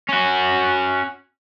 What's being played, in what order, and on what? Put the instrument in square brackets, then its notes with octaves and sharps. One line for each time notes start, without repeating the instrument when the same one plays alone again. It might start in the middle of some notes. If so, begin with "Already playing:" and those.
[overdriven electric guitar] C#4 F#4